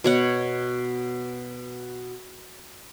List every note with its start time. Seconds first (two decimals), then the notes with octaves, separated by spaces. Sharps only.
0.04 B2 C#5 F#5